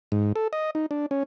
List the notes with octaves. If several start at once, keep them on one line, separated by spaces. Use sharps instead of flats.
G#2
A4
D#5
D#4
D4
C#4